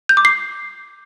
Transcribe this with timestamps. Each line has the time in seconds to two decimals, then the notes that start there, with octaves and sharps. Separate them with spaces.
0.09 G6
0.17 D6
0.25 C7